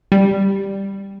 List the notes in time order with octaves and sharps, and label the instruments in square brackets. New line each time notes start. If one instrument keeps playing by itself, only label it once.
[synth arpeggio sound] G3